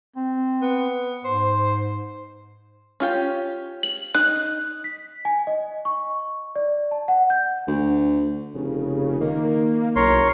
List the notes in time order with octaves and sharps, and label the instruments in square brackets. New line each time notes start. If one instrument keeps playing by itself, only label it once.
[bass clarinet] C4
[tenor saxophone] B3
[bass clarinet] G#2 [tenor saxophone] C5
[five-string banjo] C#4 F4 G4
[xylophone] F#7
[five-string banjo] D#4 [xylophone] F#6
[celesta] B6
G#5
D#5
C#6
D5
A5
F#5
G6
[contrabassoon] D2
[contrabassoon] F1 [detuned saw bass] C#3
[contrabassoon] D#3 [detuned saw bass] A#3
[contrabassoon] F#1 [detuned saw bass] B1 [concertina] A#4 C#5 C6